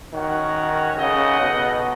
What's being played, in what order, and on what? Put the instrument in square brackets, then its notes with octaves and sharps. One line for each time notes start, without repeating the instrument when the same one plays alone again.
[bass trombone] D#3 [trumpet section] C#4 F#4 C#5 F#5
[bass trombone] C#3 [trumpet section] D#4 A4 D#5 F#5
[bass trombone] B2